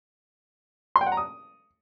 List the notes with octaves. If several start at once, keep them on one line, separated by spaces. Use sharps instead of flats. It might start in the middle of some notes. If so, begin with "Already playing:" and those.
C6
G5
F#5
A#5
D#6